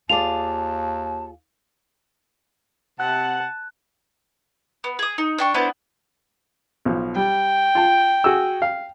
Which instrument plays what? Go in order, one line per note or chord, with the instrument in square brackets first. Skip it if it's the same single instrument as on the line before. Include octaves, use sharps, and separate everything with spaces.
[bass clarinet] D#2 [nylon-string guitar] F4 G#4 D5 [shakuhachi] A5 [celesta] F7
[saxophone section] C3 F#5 [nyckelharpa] A5 [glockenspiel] F#6
[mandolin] B3
G#4 D#6
D#4
D4 G5 C#6
B3 D4 E4 C5
[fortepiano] B1 F3
[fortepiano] G3 [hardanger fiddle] G5
[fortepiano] F4 A5
F#4 G#4 E6
F5